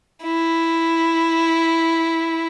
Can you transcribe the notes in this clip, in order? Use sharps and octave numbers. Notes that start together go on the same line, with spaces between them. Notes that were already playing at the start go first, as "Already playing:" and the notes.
E4